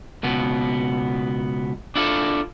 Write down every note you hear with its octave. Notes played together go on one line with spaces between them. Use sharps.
C#2 B2 B3
D4 E4 F4 A4